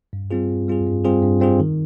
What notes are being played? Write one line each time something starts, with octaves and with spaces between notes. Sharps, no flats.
G2
G3 C4 F4 G#4
G2
G3 C4 F4 G#4
G2
G3 C4 F4 G#4
G2
G3 C4 F4 G#4
D#3